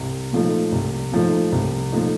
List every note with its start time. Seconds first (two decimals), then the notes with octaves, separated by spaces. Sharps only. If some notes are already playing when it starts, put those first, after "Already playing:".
Already playing: C2
0.32 A#2 F3 A3 D#4
0.72 C2
1.11 A#2 F3 A3 D#4
1.52 C2
1.93 A#2 F3 A3 D#4